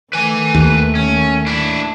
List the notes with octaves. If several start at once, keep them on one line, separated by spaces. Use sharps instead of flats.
D#3 A3 B4 G#5
D#2
C#4
D4 E4